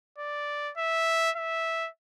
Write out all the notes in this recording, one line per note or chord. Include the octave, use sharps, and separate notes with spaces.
D5
E5
E5